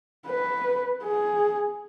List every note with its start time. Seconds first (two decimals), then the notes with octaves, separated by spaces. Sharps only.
0.27 B4
1.04 G#4